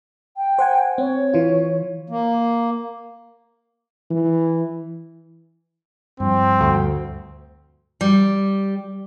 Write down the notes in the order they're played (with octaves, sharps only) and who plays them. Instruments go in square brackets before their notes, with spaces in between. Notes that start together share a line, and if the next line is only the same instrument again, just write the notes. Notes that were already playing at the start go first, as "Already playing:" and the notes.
[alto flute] G5
[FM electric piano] C5 F#5 G#5
[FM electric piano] C4 [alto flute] C#5
[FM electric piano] E3 F4
[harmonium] A#3
[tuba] E3
[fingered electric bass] G2 F3 [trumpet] C4
[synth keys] D2
[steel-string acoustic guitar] G3